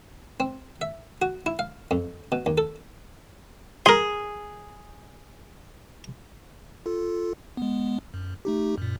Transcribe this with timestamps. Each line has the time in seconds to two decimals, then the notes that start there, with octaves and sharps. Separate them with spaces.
0.40 C4
0.81 E5
1.22 F#4
1.46 E4
1.59 F5
1.91 F2
2.32 B2
2.46 D#2
2.58 A4
3.86 G#4 A#4 C6
6.86 F4 A4
7.57 G#3 B3
8.14 F#2
8.45 A3 D#4 G4
8.78 F#2 A#2